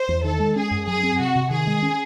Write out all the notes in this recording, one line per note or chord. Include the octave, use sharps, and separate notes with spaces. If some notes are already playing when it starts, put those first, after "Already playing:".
Already playing: C5
E2
D#3 A4
G#3
C#4 G#4
F#2
F#3 G#4
C4
C3 F#4
C3
D#3 G#4
G#3
C#4